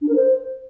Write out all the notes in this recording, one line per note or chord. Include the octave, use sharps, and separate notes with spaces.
D4
A#4
C5